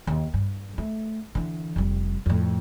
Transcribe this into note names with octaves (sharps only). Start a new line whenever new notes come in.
D#2
G2
A3
D3 E3
F1 G3
F2 A2